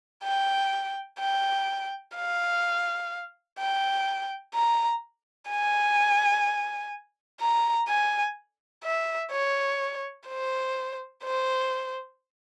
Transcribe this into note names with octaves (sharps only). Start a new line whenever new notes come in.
G5
G5
F5
G5
A#5
G#5
A#5
G#5
E5
C#5
C5
C5